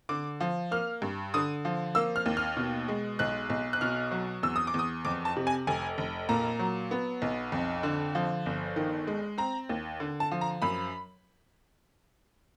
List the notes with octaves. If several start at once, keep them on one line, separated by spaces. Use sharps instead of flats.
D3 D6
F3
A#3 F6
G2
D3 D#6
F3
A#3 E6
F6
D#2
F6
B2
G#3
B1 F#6
B1
F#6
B2 F6
F#3
E2 E6
D#6
D6
E2
D#6
F2 D6
A5
C3
G#5
F1 G#5
F1
A#2 A#5
F#3
B3
B1
F2
D3
F3
G1
D#3
G#3
C4 A#5
D#2
D3
A5
F3
A#5
F#2 B5